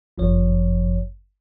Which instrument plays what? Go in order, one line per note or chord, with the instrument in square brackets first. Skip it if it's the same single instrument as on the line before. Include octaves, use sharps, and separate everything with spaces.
[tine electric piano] G1 F#2 F3 C#5